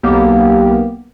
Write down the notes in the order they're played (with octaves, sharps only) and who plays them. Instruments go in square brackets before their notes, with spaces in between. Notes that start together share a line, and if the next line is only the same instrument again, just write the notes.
[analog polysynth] B1 A#3 B3 G4